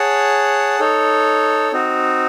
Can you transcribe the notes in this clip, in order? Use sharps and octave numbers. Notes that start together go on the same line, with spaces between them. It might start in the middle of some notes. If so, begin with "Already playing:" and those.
Already playing: G#4 C#5 F#5 A5
D#4 A4 C#5
C4 D#4 F#4